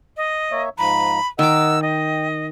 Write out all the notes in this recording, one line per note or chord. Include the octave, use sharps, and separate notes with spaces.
D#5
A#3 C#5 E5
G#2 F3 A#5 B5
D#3 A#4 D#5 F#5 D6 E6
D#5 G5